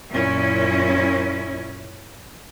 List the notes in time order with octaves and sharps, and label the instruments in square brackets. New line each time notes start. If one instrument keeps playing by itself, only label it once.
[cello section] F#2 A#2 C#4 E4